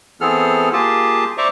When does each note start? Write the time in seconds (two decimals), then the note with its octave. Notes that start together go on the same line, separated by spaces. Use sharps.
0.21 E3 B3 C4 G#4 A4 F6
0.73 A#3 F4 G4 G#4 A5
1.38 C5 D5 E5 A#5 C#6 D6